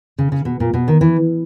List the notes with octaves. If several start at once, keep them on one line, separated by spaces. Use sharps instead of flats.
C#3
C#3
B2
A#2
B2
D#3
E3